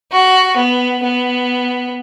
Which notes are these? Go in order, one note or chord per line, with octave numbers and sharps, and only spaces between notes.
F#4
B3
B3